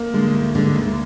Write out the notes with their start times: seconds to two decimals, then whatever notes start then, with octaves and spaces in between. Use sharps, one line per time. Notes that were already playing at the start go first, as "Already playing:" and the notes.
Already playing: A#3
0.14 D3 G#3
0.34 D2
0.55 D3 G#3
0.76 D2